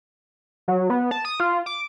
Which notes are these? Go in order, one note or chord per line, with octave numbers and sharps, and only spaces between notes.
F#3
B3
A5
D#6
F4
D6